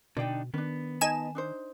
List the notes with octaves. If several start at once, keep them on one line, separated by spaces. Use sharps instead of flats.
B2 D3 D4 D#4 D5 G5
D#3 B3 C#4 D4
D#4 D#5 G#5 A5 E7
D4 D#4 C5